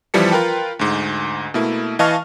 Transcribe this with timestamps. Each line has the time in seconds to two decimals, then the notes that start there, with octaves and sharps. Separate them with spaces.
0.14 F2 E3 F3 G3 A5 C#7
0.32 F4 A#4 B4 G5
0.79 D2 G#2
1.54 B2 A3 A#3 E4
1.99 E3 D#5 F5 A5 C#6 F6